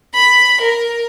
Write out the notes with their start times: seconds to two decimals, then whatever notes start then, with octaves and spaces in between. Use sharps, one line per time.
0.14 B5
0.60 A#4